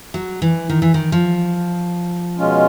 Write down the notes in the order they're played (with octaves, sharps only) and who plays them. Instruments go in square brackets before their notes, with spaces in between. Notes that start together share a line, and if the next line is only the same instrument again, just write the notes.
[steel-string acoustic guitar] F#3
E3
D#3
E3
D#3
F3
[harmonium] B2 G#3 C#4 F4